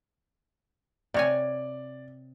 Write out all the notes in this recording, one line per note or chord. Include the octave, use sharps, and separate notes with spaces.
C3 C#5 D5 G#5